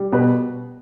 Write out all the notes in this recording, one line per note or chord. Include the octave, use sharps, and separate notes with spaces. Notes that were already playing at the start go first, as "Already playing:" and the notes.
Already playing: G3
B2 B4